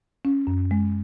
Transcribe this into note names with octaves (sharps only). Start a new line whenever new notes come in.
C#4
F#2
G#3